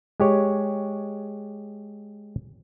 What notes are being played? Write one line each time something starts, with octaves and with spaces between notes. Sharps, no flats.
G#3 G4 C#5